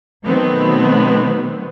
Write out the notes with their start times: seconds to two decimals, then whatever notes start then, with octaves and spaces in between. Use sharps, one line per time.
0.23 B2 D#3 F#3 A3 B3 C4